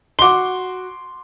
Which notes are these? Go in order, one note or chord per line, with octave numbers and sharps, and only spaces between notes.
F#4 C6 D6 G7